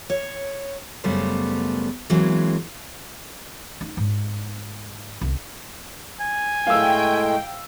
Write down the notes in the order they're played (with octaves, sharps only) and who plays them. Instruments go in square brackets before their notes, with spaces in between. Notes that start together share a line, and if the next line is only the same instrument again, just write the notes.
[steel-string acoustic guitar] C#5
F#2 C#3 G3 A3 B3 C5
E3 F#3 G#3 A#3 C4
[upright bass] D#4
G#2
C2
[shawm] G#5
[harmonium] A2 G#3 A3 [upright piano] F5 E6 [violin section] G5